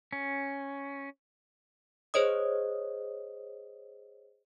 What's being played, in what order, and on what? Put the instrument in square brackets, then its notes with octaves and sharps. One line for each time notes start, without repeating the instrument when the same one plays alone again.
[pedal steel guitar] C#4
[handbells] G#4 C5 C#5 D#5 D#6